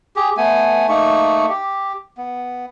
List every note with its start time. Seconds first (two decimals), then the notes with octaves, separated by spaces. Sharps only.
0.16 G4 G#4
0.37 A3 B3 G#5
0.89 A3 A#3 D#4 C#6
1.49 G4
2.17 B3